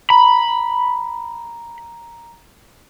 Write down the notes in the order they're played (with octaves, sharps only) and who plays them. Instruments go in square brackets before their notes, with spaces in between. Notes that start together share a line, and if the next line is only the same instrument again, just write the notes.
[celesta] A#5 [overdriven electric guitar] B5